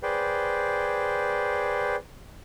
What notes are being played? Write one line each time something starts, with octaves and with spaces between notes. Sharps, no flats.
G#4 B4 C5 D5 G5